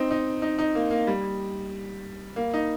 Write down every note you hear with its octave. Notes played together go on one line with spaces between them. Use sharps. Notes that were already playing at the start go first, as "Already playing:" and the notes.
Already playing: C4 D#4
D#4
D#4
D#4
A#3
A#3
G3
A#3
D#4